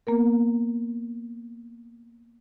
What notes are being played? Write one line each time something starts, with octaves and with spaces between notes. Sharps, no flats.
A#3 B3 A#4